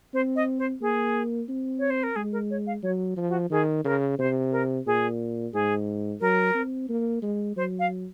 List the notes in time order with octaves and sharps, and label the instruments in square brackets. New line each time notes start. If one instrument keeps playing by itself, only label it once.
[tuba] C4 [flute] C5
[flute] D#5
C5
[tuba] A#3 [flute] G#4
[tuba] C4
[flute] C#5
C5
A#4
[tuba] G#3 [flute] G#4
[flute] A#4
C#5
F5
[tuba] F#3 [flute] C#5
[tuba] F3
[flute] F#4
[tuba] D#3 [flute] G#4
[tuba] C#3 [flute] A#4
[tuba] C3 [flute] C5
[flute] A#4
[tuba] A#2 [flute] G#4
[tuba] G#2 [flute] G#4
[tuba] F#3 [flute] A#4
[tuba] C4
A#3
G#3
[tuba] F#3 [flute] C5
[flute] F5